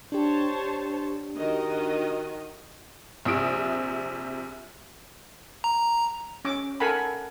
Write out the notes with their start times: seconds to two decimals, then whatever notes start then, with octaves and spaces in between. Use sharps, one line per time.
0.12 D4 G4 C5 C#5 A5
1.37 D#3 F#4 D#5
3.25 A#1 C3 D#6 D7
5.64 A#5
6.45 C#4 D6
6.80 A4 A#4 F#5 G#5 B5